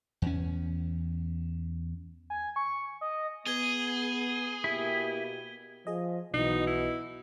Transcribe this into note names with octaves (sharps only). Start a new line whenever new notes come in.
E2 C#4
G#5
C#6
D#5
B3 G#4 G#6 D#7 G7
B2 A#3 E4 G4
F3 G#4 D#5
B1 B2 E3 D#4
E4